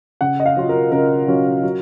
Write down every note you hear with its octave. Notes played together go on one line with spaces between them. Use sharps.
C#3 F#5
D#5
F5
F#3 C#4 F4
A#4
C#3 A#4
F#3 C#4 F4
F#3